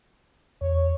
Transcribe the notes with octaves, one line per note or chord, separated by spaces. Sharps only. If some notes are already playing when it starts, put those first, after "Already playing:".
E2 C#5